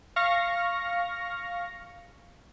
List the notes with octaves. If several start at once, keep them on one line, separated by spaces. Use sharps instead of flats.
F5 C#6 F6 A#6